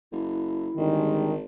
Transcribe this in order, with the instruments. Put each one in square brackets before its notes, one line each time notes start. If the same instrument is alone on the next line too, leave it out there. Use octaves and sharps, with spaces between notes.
[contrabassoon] F#1 [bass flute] E4
[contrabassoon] G#1 [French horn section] D3 G3 G#3 [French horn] D#3